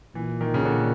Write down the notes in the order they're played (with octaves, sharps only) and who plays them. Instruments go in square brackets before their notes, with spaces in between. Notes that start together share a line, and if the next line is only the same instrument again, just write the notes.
[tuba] A#2 [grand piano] E3
[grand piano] D#3
C#3
D3